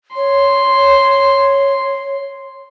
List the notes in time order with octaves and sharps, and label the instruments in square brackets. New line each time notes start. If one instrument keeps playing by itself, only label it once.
[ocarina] C#5 [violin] C6